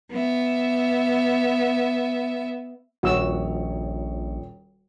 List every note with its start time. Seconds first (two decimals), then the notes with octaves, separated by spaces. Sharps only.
0.12 B3 E5
3.03 D#1 A#1 F#4 C#5 E6